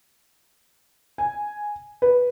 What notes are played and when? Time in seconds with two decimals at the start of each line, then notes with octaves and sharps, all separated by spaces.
1.18 G#5
2.02 B4